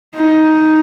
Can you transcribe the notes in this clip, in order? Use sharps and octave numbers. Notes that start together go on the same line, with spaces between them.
D#4